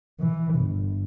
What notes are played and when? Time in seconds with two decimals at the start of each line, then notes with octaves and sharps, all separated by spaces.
0.20 E3
0.55 G1